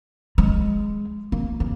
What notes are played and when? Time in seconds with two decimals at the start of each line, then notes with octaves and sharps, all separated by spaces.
0.38 G#3
1.32 A#3
1.60 A#3